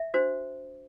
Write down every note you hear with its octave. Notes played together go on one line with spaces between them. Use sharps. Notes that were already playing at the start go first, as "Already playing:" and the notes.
Already playing: E5
D4 F#4 C5